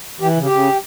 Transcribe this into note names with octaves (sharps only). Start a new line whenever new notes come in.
E3 G4
C#3
G4
C#3